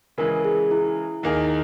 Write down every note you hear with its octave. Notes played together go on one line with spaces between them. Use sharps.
C#3 E3 G#3 A#4
G#4
E4
D#2 D#3 A#3 D#4 G#4